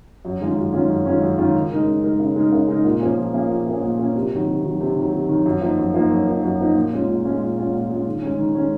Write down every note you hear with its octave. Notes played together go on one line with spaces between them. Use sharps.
F#2
D#3 G#3 C#4 F4
F#2
D#3 G#3 C#4 F4
F#2
D#3 G#3 C#4 F4
F#2
D#3 G#3 C#4 F4
C#3
G#3 D#4 A#4
C#3
G#3 D#4 A#4
C#3
G#3 D#4 A#4
C#3
G#3 D#4 A#4
A#2
F3 A#3 C#4 G#4
A#2
F3 A#3 C#4 G#4
A#2
F3 A#3 C#4 G#4
A#2
F3 A#3 C#4 G#4
C3
D#3 F#3
C3
D#3 F#3
C3
D#3 F#3
C3
D#3 F#3
F#2
F3 A#3 D#4
F#2
F3 A#3 D#4
F#2
F3 A#3 D#4
F#2
F3 A#3 D#4
A#2
G#3 C#4 F4
A#2
G#3 C#4 F4
A#2
G#3 C#4 F4
A#2
G#3 C#4 F4
D#3
G#3 C#4
D#3
G#3 C#4